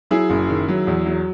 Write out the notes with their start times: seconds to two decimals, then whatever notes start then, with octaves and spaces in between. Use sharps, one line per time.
0.11 F#3 E4 G#4
0.30 F#1
0.50 D#3
0.69 F#3
0.87 E2
1.06 F#3